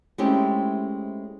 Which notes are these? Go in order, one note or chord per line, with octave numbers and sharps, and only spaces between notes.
G#3 A3 C4 C#4 E4 G4